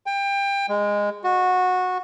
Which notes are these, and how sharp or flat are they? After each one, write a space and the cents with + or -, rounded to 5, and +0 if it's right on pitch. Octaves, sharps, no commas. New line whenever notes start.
G5 +25
G#3 -15
F#4 -15